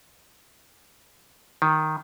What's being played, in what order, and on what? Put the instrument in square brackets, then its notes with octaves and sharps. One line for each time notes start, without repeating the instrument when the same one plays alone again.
[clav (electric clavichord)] D#3